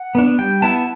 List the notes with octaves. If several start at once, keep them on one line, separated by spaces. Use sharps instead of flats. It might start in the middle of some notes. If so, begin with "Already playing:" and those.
Already playing: F#5
B3 D4
G3 G5
B3 E4 A5